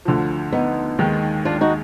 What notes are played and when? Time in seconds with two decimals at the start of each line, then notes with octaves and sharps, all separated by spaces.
0.05 D2 D3 F3
0.52 B3 D#4
0.99 D#2 D#3 G#3
1.45 D4 F4
1.61 D#4 F#4